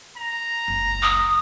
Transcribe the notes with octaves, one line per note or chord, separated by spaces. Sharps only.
A#5
F#1 C#2
D#6